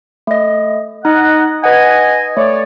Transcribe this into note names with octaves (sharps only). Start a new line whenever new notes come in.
A3 D#5
D#4 D#5 F#5
B4 D#5 F#5 G#5
A3 C#5 D5